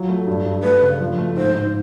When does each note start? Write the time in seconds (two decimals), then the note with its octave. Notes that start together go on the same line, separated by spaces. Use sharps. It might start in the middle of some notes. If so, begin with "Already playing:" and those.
Already playing: F#3 F4
0.09 A3
0.27 G2
0.46 G2
0.63 A3 B4
0.82 C#3
1.00 F3
1.18 A3
1.36 G#2 C5
1.55 G#2